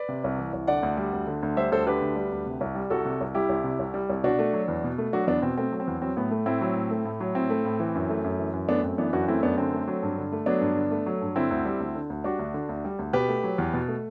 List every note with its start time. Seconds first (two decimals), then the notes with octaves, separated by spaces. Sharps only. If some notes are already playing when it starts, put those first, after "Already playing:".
Already playing: B4 D5
0.09 C3
0.24 C2
0.38 E3
0.53 C2
0.68 D3 D5 F#5
0.83 D2
0.97 G3
1.13 D2
1.27 D3
1.43 D2
1.56 G3 C5 E5
1.71 D2 A4 C5
1.86 D3 G4 B4
2.02 D2
2.16 G3
2.32 D2
2.46 C3
2.61 C2
2.75 G3
2.90 C2 F#4 A4
3.05 C3
3.21 C2
3.34 G3 E4 G4
3.49 C2
3.64 C3
3.79 C2
3.94 G3
4.09 C2
4.23 B2 D4 F#4
4.39 A3
4.53 F#3
4.68 E2
4.84 B2
4.98 A3
5.13 F#3 D4 F#4
5.27 E2 B3 D4
5.42 B2 C4
5.57 A3 C4
5.72 F#3
5.80 C4
5.87 E2
6.02 F#3 C4
6.17 A2 B3
6.31 A3
6.46 A2 C4 E4
6.61 F#3
6.76 A2
6.91 A3
7.05 A2
7.20 F#3
7.35 A2 C4 E4
7.50 A3
7.65 A2
7.80 E3
7.95 F#2
8.10 A3
8.24 F#2
8.39 E3
8.54 F#2
8.69 A3 B3 D4
8.84 F#2 C4
8.98 E3 B3 D4
9.13 F#2 D4 F#4
9.28 A3 C4 E4
9.43 F#2 B3 D4
9.58 D3 C4
9.73 A3
9.88 F#3
10.03 G2
10.18 D3
10.32 A3
10.46 F#3 B3 D4
10.61 G2
10.77 D3
10.91 A3
11.06 F#3
11.22 G2
11.36 D3 C4 E4
11.51 D2
11.65 G3
11.80 D2
11.95 D3
12.10 D2
12.24 G3 D4 F#4
12.39 D2
12.54 D3
12.69 D2
12.85 G3
12.99 D2
13.13 B2 G4 B4
13.29 A3
13.44 F#3
13.58 E2
13.74 B2
13.88 A3